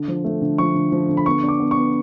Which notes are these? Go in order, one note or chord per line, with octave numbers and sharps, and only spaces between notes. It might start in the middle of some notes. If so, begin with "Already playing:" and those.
Already playing: D3
F3
A3
D3
F3 C#6
D3
F3
D3
B5
B3 C#6
D4
D6
B3
C#6
B3